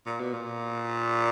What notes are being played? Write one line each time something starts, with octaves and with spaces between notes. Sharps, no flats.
A#2
B2
A#2